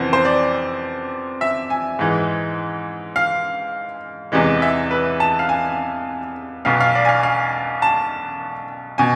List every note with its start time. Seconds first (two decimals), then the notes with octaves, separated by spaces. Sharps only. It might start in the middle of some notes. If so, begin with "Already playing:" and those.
Already playing: F2 C3 E3 B3 C5
0.13 C5
0.25 D5
1.41 E5
1.70 G#5
1.99 G#2 E3 G#3
3.16 F5
4.32 E2 C3 E3 G#3
4.62 E5
4.91 B4
5.20 A5
5.39 F5
5.49 G#5
6.65 B1 B2 B3 F5
6.81 F5
6.95 D5
7.05 G#5
7.09 F5
7.23 F5
7.82 A5
8.98 B2 G#5